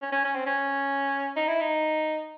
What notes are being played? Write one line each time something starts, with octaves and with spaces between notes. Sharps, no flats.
C#4
C#4
C#4
C4
C#4
D#4
E4
D#4